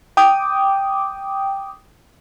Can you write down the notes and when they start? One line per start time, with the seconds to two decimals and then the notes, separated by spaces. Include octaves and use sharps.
0.17 G5 D6 D#6